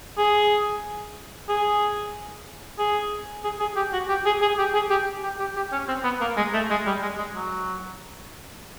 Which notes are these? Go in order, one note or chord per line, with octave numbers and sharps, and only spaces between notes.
G#4
G#4
G#4
G#4
G#4
G4
F#4
G4
G#4
G#4
G4
G#4
G4
G4
G4
G4
C#4
C4
B3
A#3
G#3
A3
G#3
G3
G#3
G#3
F#3